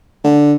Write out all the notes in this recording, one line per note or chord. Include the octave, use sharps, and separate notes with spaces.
D3